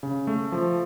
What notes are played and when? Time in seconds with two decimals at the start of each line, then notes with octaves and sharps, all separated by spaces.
0.03 C#3
0.27 A3
0.52 F3